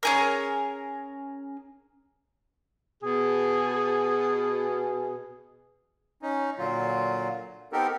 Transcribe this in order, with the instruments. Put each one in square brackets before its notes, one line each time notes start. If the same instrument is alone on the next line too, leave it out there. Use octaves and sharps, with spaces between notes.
[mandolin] C#4 G#4 A#4
[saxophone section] B2 G#4
[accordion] C#4 D#4
A#2 D3 F#3 F4
B3 C4 D#4 G4 A4 A#4